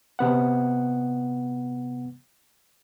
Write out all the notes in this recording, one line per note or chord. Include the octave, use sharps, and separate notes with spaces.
C3 B3 F#5